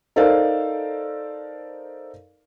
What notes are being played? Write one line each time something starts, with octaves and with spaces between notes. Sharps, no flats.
D#4 A4 A#4 C5 D5 F5